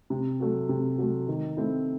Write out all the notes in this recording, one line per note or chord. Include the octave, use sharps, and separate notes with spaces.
C3
F#3 A3
C3
F#3 A3
D#3
A3 C4 E4